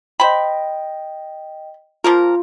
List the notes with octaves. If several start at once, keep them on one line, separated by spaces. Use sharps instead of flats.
C5 D#5 G5 B5
F3 A#3 F4 A#4